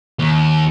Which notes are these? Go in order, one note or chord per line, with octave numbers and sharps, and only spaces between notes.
D#2